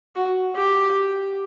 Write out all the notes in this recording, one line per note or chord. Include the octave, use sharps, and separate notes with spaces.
F#4
G4